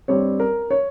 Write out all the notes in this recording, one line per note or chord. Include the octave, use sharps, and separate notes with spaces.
G2 G3 C4 C#5
A#4
C#5